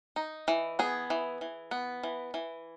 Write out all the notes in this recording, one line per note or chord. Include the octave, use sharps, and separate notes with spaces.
D#4
E3
B3 G#4
E3
E3
B3
E3
E3